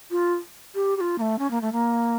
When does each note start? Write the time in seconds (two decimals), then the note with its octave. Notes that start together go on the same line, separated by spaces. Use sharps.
0.11 F4
0.74 G4
0.96 G4
1.00 F4
1.18 A#3
1.21 A3
1.38 C#4
1.50 A#3
1.61 A3
1.72 A#3